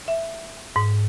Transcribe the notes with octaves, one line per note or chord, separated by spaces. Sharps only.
E5
G#2